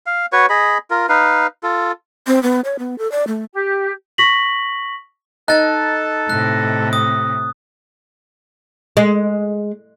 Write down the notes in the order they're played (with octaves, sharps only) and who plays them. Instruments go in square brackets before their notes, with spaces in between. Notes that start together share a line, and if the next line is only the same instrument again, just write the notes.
[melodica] F5
F#4 B4 C#5 C#6
G#4 D#5 B5
F4 A#4
D#4 B4 F5
F4 A4
[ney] C4
B3
C#5
B3
A4
D5
A3
[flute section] G4
[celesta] C#6 A#6 B6 F#7
[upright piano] D#4 [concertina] A4 A5 [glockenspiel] F#6 A6
[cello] A2 C3 [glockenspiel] F#6
[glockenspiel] D#6
[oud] G#3